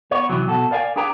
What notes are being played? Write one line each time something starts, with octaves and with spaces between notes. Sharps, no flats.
B3 C#5
C3 E3 F#3
B2 F#4 A4
A#4 D5 F5 G5 G#5
D4 G#4 B4 G5 A#5